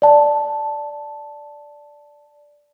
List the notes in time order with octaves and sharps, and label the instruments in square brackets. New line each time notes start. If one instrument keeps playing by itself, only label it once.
[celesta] D5 A5